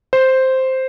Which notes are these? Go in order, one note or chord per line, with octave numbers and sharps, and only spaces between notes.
C5